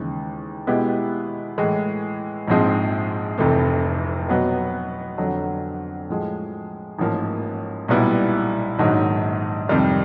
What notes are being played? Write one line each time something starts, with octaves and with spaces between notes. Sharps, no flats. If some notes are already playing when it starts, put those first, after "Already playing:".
Already playing: D#2 C#3 E3 G#3
B2 G#3 B3 E4 G4
A2 E3 G#3
A#1 G#2 F3 G#3 C4
F1 F2 C3 E3 A3
B2 F#3 B3
F2 D3 F#3
A2 F3 G#3
A1 G#2 F3 A#3
B1 A#2 G3 B3 E4
A#1 G#2 D#3 F#3
F2 C3 D#3 G3